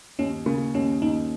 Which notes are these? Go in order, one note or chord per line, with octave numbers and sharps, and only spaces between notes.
D#2 C#4
C#3 A#3
D#2 C#4
D#2 D#4